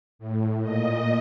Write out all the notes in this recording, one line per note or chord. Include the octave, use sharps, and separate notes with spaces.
A2
A#2 D#5